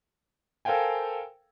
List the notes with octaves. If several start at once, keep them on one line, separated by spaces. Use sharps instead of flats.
A4 A#4 C5 F5 G5 G#5